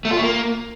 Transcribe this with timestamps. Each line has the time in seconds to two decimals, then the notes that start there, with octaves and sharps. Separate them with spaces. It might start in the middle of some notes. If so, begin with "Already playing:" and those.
0.05 A3
0.11 F4
0.17 A3
0.23 A#3